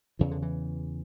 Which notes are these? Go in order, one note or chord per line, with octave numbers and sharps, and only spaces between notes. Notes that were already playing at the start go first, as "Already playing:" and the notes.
E2 C#3 E3
D3
E3